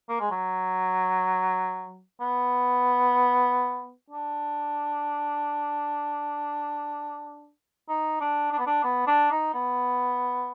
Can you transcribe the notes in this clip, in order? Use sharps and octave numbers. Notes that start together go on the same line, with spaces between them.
A#3
G#3
F#3
B3
D4
D#4
D4
D4
B3
D4
B3
D4
D#4
B3